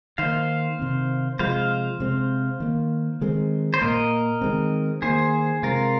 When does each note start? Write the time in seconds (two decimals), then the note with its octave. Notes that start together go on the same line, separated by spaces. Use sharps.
0.18 D#3 A#3 C5 F5
0.79 C3 D#3 C4
1.39 C3 F3 G#3 C5 F5
2.00 C3 G#3 C4
2.60 D#3 A#3
3.21 D#3 G#3 C4
3.74 C5
3.81 A#2 A#3 A#4 D#5
4.41 D#3 G#3 C4
5.02 D#3 A#3 G#4 C5
5.63 C3 G#3 C4 F4 A#4